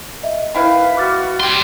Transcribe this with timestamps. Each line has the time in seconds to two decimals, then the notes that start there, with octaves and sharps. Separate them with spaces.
0.23 D#5 E5
0.55 D#3 E4 B4 F5
0.97 F#4 D6 F6 A6
1.40 G3 G4 C6